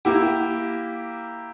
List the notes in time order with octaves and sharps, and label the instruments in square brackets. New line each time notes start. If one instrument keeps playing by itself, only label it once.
[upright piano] A#3 E4 G4